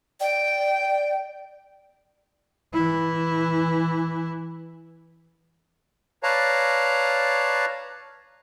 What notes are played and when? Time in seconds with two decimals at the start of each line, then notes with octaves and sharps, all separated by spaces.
0.20 D5 G5
2.73 E3 E4
6.23 B4 C#5 D5 F5 A5 A#5